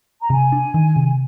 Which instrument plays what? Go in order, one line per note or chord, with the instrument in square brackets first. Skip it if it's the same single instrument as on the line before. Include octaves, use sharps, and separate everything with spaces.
[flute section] A#5
[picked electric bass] C3 [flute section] G#5
[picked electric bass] D4
D#3
C3